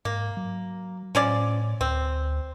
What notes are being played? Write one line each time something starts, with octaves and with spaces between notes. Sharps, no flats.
G#2 A#3
F#3
A2 F3 C#4 D5
D2 C4